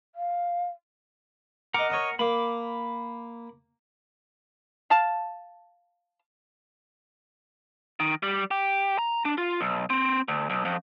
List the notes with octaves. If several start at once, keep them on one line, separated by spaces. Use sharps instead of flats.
F5
A#4 D#5 F#5 A#5 D6
C#5 D#5 D#6
A#3 B5 D6
F5 A5
D#3
G3
G4
A#5
D4
F4
B1
C4
D2
B1
F2